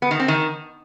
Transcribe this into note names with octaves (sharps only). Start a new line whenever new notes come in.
B3
D#3
C4
D#3